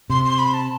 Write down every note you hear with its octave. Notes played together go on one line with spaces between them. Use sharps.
C3 C6
C6
B5
A5